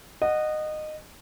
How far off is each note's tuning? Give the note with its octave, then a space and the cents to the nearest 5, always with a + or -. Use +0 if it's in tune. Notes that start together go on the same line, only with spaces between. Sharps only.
D#5 -20 F#5 +0